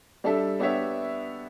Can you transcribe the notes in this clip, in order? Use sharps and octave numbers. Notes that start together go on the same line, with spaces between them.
G3 D4 A4 E5
B3 D4 G4 C#5 E5